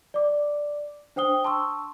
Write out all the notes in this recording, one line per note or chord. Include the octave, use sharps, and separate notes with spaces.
D5 D6
D4 C5 G5 D#6 G7
A5 C6 C#6 E6